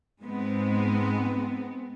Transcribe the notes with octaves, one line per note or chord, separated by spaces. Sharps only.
G#2 G#3 B3 C4